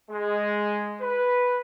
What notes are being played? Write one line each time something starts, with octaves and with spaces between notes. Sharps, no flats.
G#3
B4